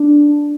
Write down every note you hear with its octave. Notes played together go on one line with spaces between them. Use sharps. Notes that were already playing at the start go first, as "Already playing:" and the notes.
Already playing: D4